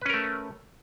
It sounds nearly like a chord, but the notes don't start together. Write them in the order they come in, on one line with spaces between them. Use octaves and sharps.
B4 C#4 A#4 A3